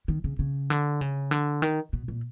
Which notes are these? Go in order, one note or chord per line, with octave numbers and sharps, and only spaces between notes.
D#3
C#3
C#3
D3
C#3
D3
D#3
B2
A#2